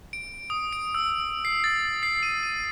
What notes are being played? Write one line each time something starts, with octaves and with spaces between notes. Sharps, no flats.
D7
D#6
D7
E6
C7
A6
C7
D#7
D#7